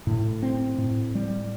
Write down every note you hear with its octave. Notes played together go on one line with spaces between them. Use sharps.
A2
C4
A2
G3